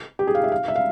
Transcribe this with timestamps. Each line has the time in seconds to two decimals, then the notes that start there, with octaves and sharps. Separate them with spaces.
0.19 G4
0.27 G#4
0.35 F5
0.44 E5
0.52 F5
0.68 E5
0.76 F5